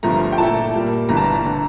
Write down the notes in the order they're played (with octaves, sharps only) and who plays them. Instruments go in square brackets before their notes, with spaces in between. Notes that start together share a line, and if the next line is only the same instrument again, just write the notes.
[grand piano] G1 G2 F3 A3 [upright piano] A#5
[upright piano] G5
[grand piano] A#2 A3 E4 A4 [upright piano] A5
[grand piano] A#2 G3 A#3
[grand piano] G1 G2 E3 [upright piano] A#5
[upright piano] A5
A#5
[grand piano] D3